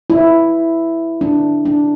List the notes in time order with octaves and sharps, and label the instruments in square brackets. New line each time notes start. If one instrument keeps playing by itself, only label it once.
[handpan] E4
D4
D4